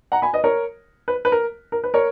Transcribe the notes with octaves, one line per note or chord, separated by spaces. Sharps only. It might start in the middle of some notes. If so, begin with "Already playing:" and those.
F#5 A#5
G#5 B5
B4 D#5
A#4 C#5
B4
B4
A#4
A#4
B4
A#4 C#5